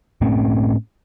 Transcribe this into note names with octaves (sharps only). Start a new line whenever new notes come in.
A2 A3 C4 C#4